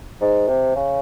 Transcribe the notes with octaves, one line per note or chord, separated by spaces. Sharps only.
G#2
C3
C#3